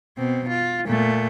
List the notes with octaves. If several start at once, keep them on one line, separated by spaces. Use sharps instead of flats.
B2 C4
F4
A#2 A3